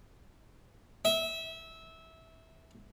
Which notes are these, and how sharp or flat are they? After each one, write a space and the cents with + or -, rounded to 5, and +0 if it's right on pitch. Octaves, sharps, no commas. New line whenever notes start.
E5 -20